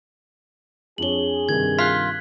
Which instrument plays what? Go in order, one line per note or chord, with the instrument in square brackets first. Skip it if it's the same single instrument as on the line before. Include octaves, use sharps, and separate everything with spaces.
[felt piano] F2 D4 C#5 [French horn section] G#4 [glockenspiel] F#7 G7
[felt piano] G2 C3 D#3 [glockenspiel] G#6
[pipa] F4 [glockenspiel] F#6 B6